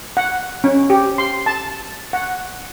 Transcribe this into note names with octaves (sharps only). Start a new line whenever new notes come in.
F#5
C#4
G4
C6
A5
F#5